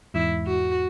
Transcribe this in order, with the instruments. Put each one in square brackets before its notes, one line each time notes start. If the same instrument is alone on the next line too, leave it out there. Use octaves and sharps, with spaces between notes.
[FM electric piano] E2 G#2 [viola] E4
[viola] F#4